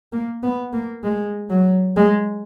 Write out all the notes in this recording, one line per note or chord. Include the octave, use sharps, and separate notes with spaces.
A#3
B3
A#3
G#3
F#3
G#3